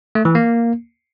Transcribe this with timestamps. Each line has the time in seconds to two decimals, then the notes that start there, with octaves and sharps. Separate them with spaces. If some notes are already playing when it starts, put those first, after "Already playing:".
0.15 A3
0.25 E3
0.35 A#3